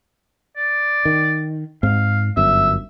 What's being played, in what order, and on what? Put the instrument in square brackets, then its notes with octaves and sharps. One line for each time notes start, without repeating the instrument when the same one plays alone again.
[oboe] D5
[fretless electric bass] D#3
[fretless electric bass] G#2 C4 [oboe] F5
[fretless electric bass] G1 F#2 [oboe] E5